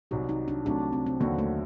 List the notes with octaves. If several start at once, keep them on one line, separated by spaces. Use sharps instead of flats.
C2 C3 F#3 D#4
D#4
D4
C2 C3 F#3 A3 D4
C4
C4
D#2 D3 F#3 A#3 C4 F#4
A3